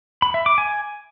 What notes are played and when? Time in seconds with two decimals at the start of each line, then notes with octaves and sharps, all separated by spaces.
0.22 B5
0.34 E5
0.46 D6
0.58 G#5